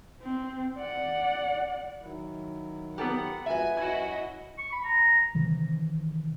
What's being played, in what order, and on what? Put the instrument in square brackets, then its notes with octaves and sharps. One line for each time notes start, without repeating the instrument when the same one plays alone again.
[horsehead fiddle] C4
D5 F#5
[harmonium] D#3 F#3 E4
[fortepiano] B3 A4 A#4 [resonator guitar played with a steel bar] G4 [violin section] F#5
[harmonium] F2 G#3 F#4 [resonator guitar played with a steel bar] B4 E5 [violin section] G#5
[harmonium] F#2 C#5 [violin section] E4 F#4 D#5 [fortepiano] G#5
[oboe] C#6
B5
A#5
[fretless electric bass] C3 D#3 E3